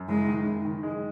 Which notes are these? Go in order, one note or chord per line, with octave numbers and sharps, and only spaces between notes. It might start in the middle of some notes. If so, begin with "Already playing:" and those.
Already playing: F#2
F#1 G#3
D#3
F#1
D#3
G#3